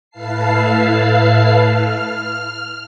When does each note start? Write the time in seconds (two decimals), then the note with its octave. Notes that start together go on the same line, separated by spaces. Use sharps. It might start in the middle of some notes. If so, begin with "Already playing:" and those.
0.10 A2 E4 B4 F5 A5 C7
1.61 F6